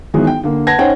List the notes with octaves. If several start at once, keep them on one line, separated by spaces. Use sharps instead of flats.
D#3 E3 F#3 G#3 B3
G5
D3 A#3
B4 F#5 A5 G#6 A#6
C#4 D#4 C5 F#5 G5